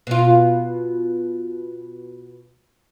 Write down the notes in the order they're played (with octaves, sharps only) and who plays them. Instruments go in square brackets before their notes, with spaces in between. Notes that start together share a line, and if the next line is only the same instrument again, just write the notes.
[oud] B2 F4